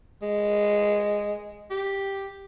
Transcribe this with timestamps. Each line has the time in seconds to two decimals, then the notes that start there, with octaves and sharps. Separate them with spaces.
0.22 G#3
1.70 G4